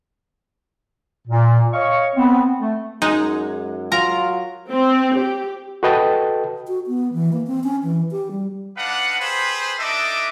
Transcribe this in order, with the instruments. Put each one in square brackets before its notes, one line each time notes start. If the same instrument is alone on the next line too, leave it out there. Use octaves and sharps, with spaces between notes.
[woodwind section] A#2
C#5 D#5 F5 C#6
B3 C4
A3
[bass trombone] F#2 [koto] G#3 [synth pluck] D#4
[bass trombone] F#3 [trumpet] F4 [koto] A#4 A#5
[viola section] C4
G4
[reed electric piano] F#4 A4 B4 D#5 G5 A5
[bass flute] F#4
B3
E3
A#3
C4
C#4
E3
G4
G3
[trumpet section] D4 D#4 B4 F5 F#5
G4 G#4 B4 C5
D4 D#4 A4 D#5 E5 D6